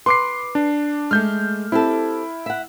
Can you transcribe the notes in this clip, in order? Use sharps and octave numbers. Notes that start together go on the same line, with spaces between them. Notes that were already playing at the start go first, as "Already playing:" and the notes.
B4 C6 D6 C7
D4
G#3 A3 F6 G6
C4 E4 G4 A4
E5 F#5